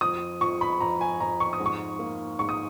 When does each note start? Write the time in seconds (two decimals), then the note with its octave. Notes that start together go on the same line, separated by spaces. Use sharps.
0.01 F2 D#6
0.41 F2 C#6
0.61 B5
0.81 F2 A#5
1.01 G#5
1.20 F2 A#5
1.40 C#6
1.53 D#6
1.60 G#2
1.66 C#6
1.99 A#3
2.39 G#2 C#6
2.49 D#6